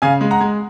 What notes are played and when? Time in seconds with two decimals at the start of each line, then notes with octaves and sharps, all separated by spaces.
0.02 C#3 F5 G#5
0.21 G#3
0.31 F#5 A#5
0.41 G#3